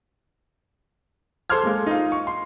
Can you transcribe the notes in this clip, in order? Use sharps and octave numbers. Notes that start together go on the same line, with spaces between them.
A4 C5 C6 D6 F6 G#6
G#3 A#3 A4
D#4 F4
C#6
C6